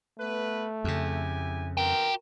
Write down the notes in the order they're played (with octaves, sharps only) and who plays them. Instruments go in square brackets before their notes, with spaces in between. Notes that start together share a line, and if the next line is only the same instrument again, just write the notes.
[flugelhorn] A3 [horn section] B3 B4
[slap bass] F2 C#3 [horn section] E4 G4 G#5
[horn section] D#3 B3 C4 [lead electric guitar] F#4 G5 [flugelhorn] A#4